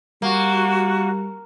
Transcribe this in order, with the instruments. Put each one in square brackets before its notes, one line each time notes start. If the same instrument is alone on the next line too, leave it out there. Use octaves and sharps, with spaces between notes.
[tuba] G3 [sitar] A#3 [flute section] F#4